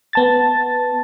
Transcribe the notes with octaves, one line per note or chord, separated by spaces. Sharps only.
B3 A5 A6